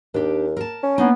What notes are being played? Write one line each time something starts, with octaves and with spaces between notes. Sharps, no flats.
D#2 D4 G4
A#4 A5
C#4
A#3 B3 D4 D#4